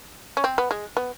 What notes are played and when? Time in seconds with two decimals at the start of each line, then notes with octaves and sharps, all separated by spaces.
0.37 C#4
0.44 C4
0.58 B3
0.71 G#3
0.97 B3